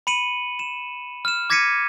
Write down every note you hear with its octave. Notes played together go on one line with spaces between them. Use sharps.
B5 C#7 D#7 F#7
E7
F6 E7
D6 G#6 A#6 B6 C#7 D#7